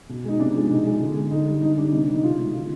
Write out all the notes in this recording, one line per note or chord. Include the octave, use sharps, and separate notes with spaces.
B2
G#3 D#4
C3 D4
F3 G#3
B2 D#4
G#3
D3
G#3
D3 D#4
G3
D3 D#4
G3 D4
C3 D#4
D4
D#3 G3
D#4
B2 F4
G#3
D3 F4